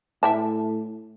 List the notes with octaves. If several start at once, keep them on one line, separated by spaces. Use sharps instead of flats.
A2 E5 G5 A5